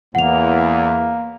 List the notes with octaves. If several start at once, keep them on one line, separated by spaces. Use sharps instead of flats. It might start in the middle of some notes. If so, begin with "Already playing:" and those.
E2 A#3 F#5 F7